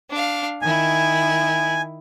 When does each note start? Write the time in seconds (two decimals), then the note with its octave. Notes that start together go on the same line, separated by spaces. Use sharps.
0.10 D4 F5
0.62 D#3 E4 G#5